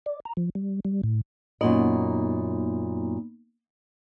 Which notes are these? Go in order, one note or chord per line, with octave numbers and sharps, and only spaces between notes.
D5
A#5
F3
G3
G3
A2
F#2 A#2 A#3 B3 D#4 D#5